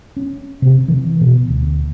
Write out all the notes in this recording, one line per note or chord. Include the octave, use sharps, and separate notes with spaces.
C#4
C3
E3
B2
D2